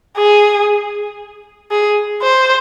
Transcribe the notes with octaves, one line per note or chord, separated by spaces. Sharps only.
G#4
G#4
C5